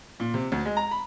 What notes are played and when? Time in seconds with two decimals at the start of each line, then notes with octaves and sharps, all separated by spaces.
0.20 A#2
0.34 C3
0.52 D2
0.65 G#3
0.77 A#5
0.91 B5